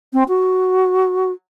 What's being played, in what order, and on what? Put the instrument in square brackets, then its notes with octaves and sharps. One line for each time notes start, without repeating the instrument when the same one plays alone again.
[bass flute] C4
F#4